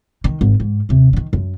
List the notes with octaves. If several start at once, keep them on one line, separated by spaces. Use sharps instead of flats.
D#3
G#1
G#2
D#2 C3
D3 D#3
F#2